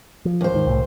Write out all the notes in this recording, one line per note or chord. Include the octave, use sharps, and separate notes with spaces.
F3
D#2 C5
G#2 D#3
C2 A2